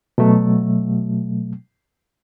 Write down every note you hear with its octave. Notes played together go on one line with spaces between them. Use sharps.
B2 F#3 A3